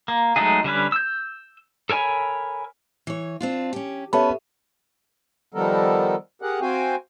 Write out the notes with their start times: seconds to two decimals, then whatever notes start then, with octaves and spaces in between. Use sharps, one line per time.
0.08 A#3
0.36 F#3 G#3 A3 D#4 G#4
0.64 D3 G3 C#4 B4
0.92 E6 G6
1.90 A4 A#4 C#5 G#5 B5
3.07 E3 C#5
3.41 C4 D4 F4
3.73 C#4 G4
4.13 B3 C#4 G4 A4 C#5 E5 A5 B5
5.54 D#3 F3 G3 B3 A4 A#4
6.42 G4 G#4 A#4 F#5
6.61 C4 F#4 F5 G5 G#5